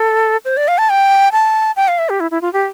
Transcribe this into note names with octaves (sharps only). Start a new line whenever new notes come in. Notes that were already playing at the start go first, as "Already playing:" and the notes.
Already playing: A4
C5
D5
F5
A5
G5
A5
G5
F5
E5
G4
E4
E4
F4
G4